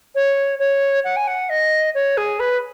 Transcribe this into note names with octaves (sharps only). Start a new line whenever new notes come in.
C#5
C#5
F#5
G#5
F#5
D#5
C#5
G#4
B4